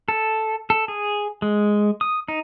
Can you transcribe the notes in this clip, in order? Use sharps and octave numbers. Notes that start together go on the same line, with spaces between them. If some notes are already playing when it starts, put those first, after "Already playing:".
A4
A4
G#4
G#3
D#6
D#4